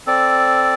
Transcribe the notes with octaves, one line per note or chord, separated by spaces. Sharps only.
C4 A4 D5